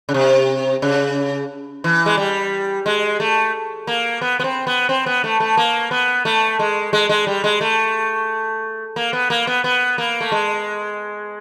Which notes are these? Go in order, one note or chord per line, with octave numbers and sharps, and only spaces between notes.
C#3
C3
C#3
E3
G#3
G3
G#3
A3
A#3
B3
B3
C4
B3
C4
B3
A3
A3
A#3
B3
A3
G#3
G#3
G#3
G3
G#3
A3
A#3
B3
A#3
B3
B3
A#3
A3
G#3